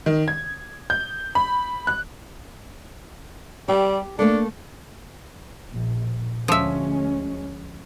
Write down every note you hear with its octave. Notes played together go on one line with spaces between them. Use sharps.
D#3
G#6
G6
B5
F#6
G3 G4
A3 A#3 D4 A4
A#1
D2 F3 G#3 C#4 E5